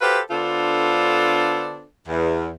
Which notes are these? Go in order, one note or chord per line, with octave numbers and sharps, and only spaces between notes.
F#4 G4 A4 B4 C5 F5
D3 B3 D4 F4 A4 C5
E2